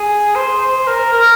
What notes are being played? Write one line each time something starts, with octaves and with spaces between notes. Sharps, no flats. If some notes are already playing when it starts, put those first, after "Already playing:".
Already playing: G#4
C5
C5
A#4
A#4